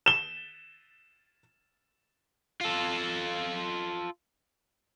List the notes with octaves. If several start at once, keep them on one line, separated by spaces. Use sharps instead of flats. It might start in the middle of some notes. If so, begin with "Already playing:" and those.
E7 G7
F4 A4